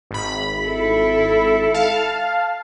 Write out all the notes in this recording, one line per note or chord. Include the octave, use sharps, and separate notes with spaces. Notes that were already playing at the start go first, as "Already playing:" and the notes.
G#1 B5
E4 A4
F5 A5